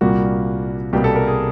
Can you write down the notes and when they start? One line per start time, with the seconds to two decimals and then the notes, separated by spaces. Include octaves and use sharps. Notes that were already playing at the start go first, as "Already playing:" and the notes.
0.01 C2 A#2 G3 A#3 F#4
0.93 C2 B2 G3 A#3 G4
1.04 A4
1.16 A#4
1.27 G#4